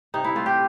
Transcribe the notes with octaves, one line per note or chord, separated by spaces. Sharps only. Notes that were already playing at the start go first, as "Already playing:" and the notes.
C3 D#4
E4
A3 F4
G4